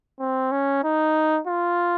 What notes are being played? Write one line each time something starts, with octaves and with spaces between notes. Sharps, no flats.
C4
C#4
D#4
F4